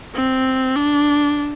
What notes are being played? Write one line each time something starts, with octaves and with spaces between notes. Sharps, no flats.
C4
D4